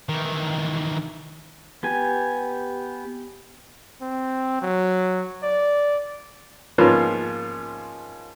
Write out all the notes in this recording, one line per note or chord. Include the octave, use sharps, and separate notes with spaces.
D#3 E3
B3 G4 G#5
C4
F#3
D5
G#2 F3 A#3 B3 C#4 F4